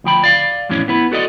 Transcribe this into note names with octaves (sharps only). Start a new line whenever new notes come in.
D2 F3 G5 B5
D5 F5
F2 A2 E3 C#4
B3 E4 B4
F#4 A4 D5 D#5